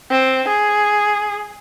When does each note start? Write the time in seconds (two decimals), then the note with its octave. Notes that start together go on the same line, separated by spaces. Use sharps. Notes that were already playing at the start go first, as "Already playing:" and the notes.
0.11 C4
0.48 G#4